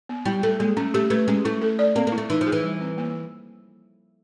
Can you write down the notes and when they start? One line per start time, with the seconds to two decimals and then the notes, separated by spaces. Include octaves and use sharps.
0.09 B3
0.25 G3 E4
0.43 A3 A4
0.60 G#3 A#3
0.77 A3 C#4
0.94 A3 G4
1.10 A3 B4
1.28 G#3 C#4
1.45 A3 E4
1.62 A4
1.79 D5
1.96 A#3 C4
2.07 A#3
2.12 E4
2.18 A3
2.30 E3 D#4
2.41 F3
2.47 G#4
2.52 E3
2.63 G3
2.81 C4
2.98 A#3